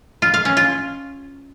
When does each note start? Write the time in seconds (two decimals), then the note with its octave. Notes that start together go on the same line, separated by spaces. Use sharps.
0.22 F4
0.34 F5
0.45 C#4
0.57 F4